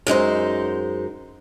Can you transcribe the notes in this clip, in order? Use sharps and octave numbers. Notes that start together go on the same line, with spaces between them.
F#2 G#3 D#4 C5